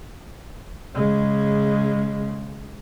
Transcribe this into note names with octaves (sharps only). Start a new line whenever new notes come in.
C#3 G#3